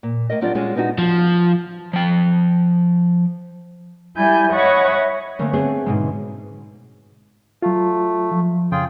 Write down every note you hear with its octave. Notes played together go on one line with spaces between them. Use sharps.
A#2
A2 A#4 D#5
F#3 G3 C4 D4 F4 D5
G3 G#3 C#4 F4 F#4 G#4
B3 D4 D#4 F4 F#4
F3
F3 G5
G3 E4 G#5 G6
C#5 D#5 E5 F#5 B5 C#6
D3 A3 A#3 C4 C#4
B3 C4 G#4
G#2 B2 G#3
F#3 A3 F4
F3
F2 C#3 F4 G#4 G5